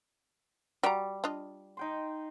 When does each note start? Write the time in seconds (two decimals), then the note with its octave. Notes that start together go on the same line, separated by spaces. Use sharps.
0.83 G3 F#4 A#5
1.24 D4 F4 D#5
1.77 D#4 G5 C6